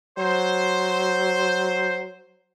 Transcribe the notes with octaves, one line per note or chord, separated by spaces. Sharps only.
F#3 C5